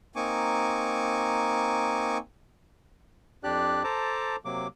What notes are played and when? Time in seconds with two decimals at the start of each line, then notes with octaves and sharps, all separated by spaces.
0.16 A#3 C4 D#4 G#5 C#6 D6
3.44 F2 D4 G4 D5 F#6
3.84 A4 C5 A5 A#5 D6
4.45 C3 F#3 A#3 D6